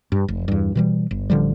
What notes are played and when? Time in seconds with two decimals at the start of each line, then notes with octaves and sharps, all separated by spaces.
0.12 G2
0.28 F1
0.48 E2 G2
0.75 B2 E3 G3
1.11 G1
1.30 A1 D3 F3 G3